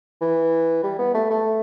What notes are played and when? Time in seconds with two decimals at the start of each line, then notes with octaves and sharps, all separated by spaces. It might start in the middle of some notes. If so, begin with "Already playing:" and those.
0.21 E3
0.83 G3
0.99 B3
1.14 A3
1.30 A3